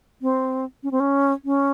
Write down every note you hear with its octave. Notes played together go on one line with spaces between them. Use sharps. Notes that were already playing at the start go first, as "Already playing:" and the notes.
C4
C#4
C4
C#4
C#4